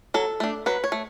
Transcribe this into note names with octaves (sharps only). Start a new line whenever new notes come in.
F#3 A4
A3 D4
F#3 B4
C#5
A3